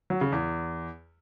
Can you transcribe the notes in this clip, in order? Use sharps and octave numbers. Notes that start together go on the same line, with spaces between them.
F#3
C#3
E2